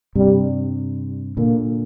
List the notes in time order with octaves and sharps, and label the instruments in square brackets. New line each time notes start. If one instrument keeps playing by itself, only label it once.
[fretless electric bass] G2 C3 [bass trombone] G3
[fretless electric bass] A#2 D3 [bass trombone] A#3